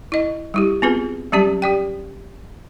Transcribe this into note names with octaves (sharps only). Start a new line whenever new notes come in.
E4 D#5
G3 E4 G4
B3 C4 F4 G#4 B4
F#3 G3 C#4 G4 D5 A5
G4 D5 G5